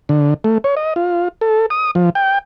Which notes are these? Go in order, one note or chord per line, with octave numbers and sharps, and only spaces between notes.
D3
A3
C#5
D#5
F4
A4
D#6
F3
G5